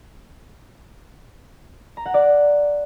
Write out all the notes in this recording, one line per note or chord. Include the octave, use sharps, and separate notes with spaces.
A#5
F#5
D5